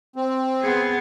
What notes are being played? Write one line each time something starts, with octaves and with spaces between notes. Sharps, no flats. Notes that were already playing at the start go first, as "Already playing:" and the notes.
C4
B3 G#4